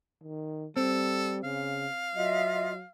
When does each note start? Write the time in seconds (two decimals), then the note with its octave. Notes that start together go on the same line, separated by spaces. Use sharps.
0.23 D#3
0.76 G3 C4 A4
1.44 C#3 F5
2.15 F#3 F4 D#5 E5